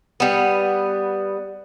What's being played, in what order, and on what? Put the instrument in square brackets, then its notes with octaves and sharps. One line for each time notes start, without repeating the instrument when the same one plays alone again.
[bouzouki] G3 B3